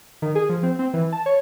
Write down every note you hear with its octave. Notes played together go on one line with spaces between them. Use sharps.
D#3
G#4
F3
C4
C4
E3
A5
C#5